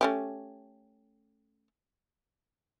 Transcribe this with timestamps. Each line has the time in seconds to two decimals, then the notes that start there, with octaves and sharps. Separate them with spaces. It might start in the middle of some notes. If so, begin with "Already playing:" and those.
0.01 A3 C#4 G4